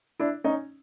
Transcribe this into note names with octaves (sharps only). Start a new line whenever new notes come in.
D4 E4
C#4 D#4